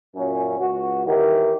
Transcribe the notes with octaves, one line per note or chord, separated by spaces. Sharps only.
F#2 A#2 F#3 C#4
C#2 F#4
D#2 D#3 E3 G4 A#4